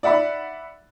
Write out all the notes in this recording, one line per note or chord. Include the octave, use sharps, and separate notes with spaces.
D5 E5 F#5 B5